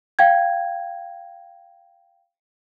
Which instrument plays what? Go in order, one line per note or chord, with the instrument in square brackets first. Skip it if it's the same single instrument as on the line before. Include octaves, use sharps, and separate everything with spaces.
[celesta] F5 G5 G#6